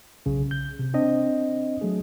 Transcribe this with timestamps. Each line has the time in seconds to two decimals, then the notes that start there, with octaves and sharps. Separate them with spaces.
0.26 B1 C#3
0.51 G6
0.79 C3
0.94 C4 D4 D#5
1.81 F#3 A3 G#4